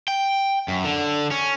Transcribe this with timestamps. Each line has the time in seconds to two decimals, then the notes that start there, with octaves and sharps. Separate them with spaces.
0.08 G5
0.68 F#2
0.85 D3
1.31 C#4